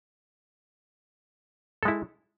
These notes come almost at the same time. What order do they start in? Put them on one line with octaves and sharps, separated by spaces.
A4 G#3 E4